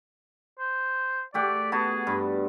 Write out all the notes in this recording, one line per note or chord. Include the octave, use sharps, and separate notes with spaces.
C5
A3 G4 D5 F#5
B3 F#4 G#4 A5
G2